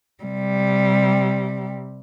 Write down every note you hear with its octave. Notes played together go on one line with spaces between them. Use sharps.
C3 G3